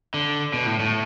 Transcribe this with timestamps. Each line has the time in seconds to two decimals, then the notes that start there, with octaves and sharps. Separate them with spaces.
0.14 D3
0.54 B2
0.66 A2
0.80 A2